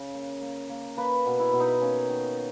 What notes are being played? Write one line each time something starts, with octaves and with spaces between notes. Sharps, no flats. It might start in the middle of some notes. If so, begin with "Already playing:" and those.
Already playing: C#3
A#3
A#3
A#3
A#3 B4
B2
E4
B2
D#4
A#3 C#4
D#3